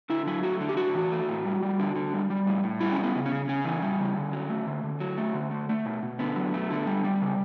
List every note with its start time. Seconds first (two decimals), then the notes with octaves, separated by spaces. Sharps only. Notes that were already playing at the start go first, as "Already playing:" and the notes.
0.10 D3 E4
0.27 F#3 E4
0.43 A3 F#4
0.60 D3
0.69 G4
0.77 A2 F#4
0.95 E3
1.12 A3
1.29 A2
1.45 G3
1.63 G3
1.80 D3
1.96 D3
2.14 G3
2.30 G3
2.47 A2
2.63 A2
2.81 G3 E4
2.92 C#4
2.98 G3
3.04 B3
3.15 C#3
3.26 C#4
3.32 C#3
3.49 C#3 C#4
3.65 E3
3.82 G3
3.99 C#3
4.16 D3
4.33 F#3
4.50 A3
4.67 D3
4.83 D3
5.00 F#3
5.18 A3
5.34 D3
5.51 A3
5.69 A3
5.86 B2
6.03 B2
6.19 D3 B3
6.36 F#3
6.54 A3
6.70 D3
6.87 G3
7.04 G3
7.22 C#3